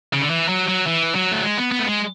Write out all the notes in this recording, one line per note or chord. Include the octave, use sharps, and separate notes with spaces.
C#3
D3
E3
F#3
F#3
E3
F#3
A3
G#3
B3
B3
A3
G#3